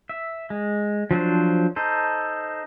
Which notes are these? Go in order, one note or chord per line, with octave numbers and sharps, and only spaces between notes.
E5
G#3
F3 F#3 D4 C5
D#4 A4 C5